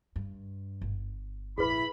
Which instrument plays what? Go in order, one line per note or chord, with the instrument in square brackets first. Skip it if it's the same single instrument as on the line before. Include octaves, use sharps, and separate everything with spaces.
[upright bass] G2
G1
[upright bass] A#1 F2 [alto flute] E4 [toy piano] G#4 B4 [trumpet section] B5